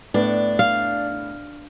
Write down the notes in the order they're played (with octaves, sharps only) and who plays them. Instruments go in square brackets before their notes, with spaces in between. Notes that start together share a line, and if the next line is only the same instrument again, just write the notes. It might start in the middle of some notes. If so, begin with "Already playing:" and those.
[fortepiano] A2 B3 [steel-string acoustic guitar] D4
[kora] F5